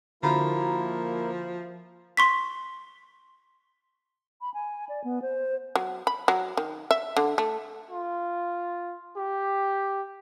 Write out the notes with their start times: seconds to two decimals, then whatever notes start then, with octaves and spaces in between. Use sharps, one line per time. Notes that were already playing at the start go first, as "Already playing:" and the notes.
0.23 D3 F3 A#3 E4 F#4 A#4 A#5 B5
2.17 C6 C#6 B6
4.40 B5
4.54 G#5
4.89 D5
5.04 B3
5.22 C5
5.76 F#3
6.07 B5
6.28 F#3
6.57 D#3
6.91 E5
7.17 D3
7.38 A3
7.91 F4
9.17 G4